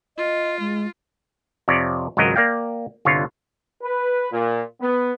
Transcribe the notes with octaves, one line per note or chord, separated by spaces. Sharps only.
F4 D#5
G#3
F2 C3 C#5 D5
G#1 C#2 F#3 A#4 D#5
A#3 D5 F5 G5
G1 C2 D3 F4 C#5
B4
A#2
B3